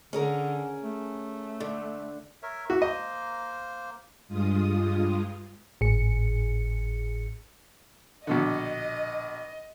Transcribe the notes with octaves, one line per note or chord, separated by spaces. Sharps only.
D3 C#4 G#4 A#4
A3
D3
A#4 C#5 E5
A#3 F#4 E5
A#3 C5 D#5
G2 G#3 F4 D#6
G#1 A2 G#4 C#7
A#1 B2 D3 D#5